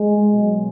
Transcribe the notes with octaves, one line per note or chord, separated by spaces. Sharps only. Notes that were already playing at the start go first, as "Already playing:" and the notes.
Already playing: G#3
B2 F#3